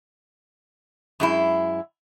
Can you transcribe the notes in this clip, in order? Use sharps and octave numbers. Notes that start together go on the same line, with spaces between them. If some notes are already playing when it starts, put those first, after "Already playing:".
F#2 G#3 E4